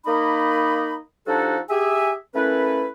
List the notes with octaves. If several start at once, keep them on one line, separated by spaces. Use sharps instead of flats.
A#3 D#4 D#5 B5
F3 G3 D4 D#4 F#4 A4
G4 G#4 E5 G#5
A3 A#3 C#4 E4 B4